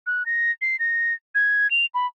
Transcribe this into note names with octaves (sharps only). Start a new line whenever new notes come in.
F#6
A#6
C7
A#6
G#6
F7
B5